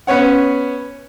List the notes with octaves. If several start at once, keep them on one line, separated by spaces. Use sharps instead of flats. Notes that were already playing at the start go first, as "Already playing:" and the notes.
B3 C#4 C#5 F#5